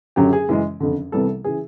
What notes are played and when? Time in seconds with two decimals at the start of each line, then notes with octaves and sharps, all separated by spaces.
0.16 F#1 F#2 D3 F#3 G4
0.33 G#4
0.49 F#2 C#3 E3 G#3
0.80 F#1 F2 D3
1.12 C2 C3 E3 G3 B3 A4
1.44 C#3 E3 G#4